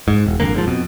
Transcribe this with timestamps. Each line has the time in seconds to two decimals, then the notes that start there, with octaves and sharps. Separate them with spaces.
0.08 G#2
0.26 E1
0.40 G#1 F2 D3 A#3
0.55 G#2 E3 F3
0.67 F2 B2